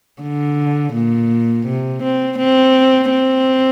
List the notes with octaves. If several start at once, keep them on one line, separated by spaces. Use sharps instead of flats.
D3
A#2
C3
C4
C4
C4